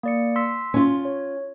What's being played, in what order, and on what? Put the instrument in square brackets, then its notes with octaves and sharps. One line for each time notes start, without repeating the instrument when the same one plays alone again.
[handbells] A#3 D5 C#7
C6 E6 B6
[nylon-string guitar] C#4 F4
[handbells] C#5